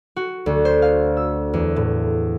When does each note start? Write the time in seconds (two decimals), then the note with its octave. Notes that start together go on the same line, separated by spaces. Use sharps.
0.16 F#4
0.46 D2
0.65 C5
0.82 F5
1.17 E6
1.54 E2
1.76 A2